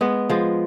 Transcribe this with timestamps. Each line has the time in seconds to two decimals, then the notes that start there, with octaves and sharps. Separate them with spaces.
0.01 G#3 B3
0.30 F3 G#3